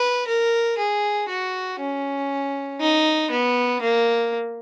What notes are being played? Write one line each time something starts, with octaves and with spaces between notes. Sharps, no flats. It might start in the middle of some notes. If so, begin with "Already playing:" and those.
Already playing: B4
A#4
G#4
F#4
C#4
D#4
B3
A#3